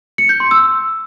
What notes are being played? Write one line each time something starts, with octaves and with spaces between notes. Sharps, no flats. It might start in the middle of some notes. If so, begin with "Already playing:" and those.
C#7
G6
C6
E6